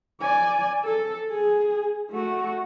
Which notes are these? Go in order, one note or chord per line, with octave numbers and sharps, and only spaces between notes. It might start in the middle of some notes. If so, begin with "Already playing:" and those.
D5 G#5
A4
G#4
A3 F#4